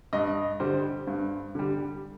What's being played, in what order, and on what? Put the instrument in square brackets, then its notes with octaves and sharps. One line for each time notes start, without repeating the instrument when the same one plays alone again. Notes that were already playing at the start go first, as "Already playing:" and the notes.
[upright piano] G2 D#5
D3 G3 C5
G2
D3 G3